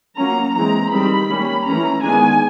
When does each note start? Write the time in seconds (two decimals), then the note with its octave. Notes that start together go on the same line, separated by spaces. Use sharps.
0.18 F#3 A#3 C#4 A#5
0.55 E3 G#3 C4 A#5
0.92 D#3 G3 C4 B5
1.30 G3 A#3 C#4
1.67 E3 A3 C#4 A#5
2.03 D#3 G#3 B3 D4 G#5